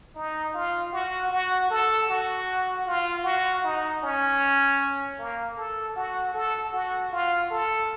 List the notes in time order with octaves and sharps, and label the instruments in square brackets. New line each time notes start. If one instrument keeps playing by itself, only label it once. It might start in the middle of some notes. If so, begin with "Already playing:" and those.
[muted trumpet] D#4
F4
F#4
F#4
A4
F#4
F4
F#4
D#4
C#4
A#3
A4
F#4
A4
F#4
F4
A4